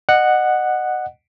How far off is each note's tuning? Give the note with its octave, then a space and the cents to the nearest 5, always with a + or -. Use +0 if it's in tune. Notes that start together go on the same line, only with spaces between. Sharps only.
D#5 -30 F#5 +0